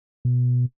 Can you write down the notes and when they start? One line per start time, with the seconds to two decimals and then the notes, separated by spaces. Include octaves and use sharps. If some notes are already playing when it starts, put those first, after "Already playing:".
0.25 B2